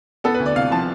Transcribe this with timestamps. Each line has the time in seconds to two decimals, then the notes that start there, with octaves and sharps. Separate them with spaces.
0.24 B3 A4
0.34 B4
0.40 D2
0.46 D5
0.55 C3 F5
0.71 F3 A5